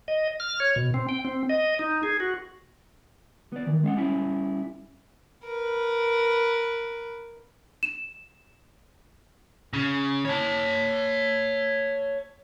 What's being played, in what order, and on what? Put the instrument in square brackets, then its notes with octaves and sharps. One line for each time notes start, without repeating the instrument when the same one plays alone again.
[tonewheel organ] D#5
F6
C#5
B2
C4
G5
C4
D#5
D#4
G#4
F#4
[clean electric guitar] B3 D5
D#3 E3
G#3 C#4 F5 F#5
G3 C#4 E4
[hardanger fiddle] A#4 B4
[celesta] E7
[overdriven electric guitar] C#3
C#5 A5